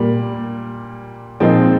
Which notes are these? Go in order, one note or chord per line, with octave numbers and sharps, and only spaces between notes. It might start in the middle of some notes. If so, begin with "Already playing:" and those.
Already playing: A#2 G3 A#3
A#2 F3 G#3 C4 D#4